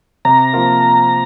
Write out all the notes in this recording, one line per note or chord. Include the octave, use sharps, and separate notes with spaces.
C3 A#5
F3 A#3 F4 A#4